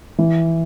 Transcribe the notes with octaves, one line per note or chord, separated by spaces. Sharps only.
E3